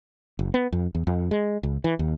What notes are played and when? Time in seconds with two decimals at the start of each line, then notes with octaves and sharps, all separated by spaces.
0.39 F#1
0.54 B3
0.72 F2
0.95 E2
1.07 F2
1.31 G#3
1.63 C#2
1.84 E3
1.99 D#2